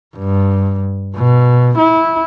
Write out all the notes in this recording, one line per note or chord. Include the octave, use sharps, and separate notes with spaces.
G2
B2
E4